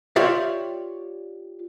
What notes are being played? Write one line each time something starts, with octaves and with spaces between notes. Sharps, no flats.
F4 G4 C#5 D5 E5